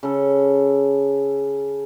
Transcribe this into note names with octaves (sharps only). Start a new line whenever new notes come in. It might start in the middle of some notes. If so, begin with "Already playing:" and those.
C#3 A4